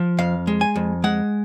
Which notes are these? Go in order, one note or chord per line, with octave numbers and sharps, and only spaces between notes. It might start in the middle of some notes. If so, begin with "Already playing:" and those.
Already playing: F3
F2 F5
G#3
G#5
F2
G#3 F#5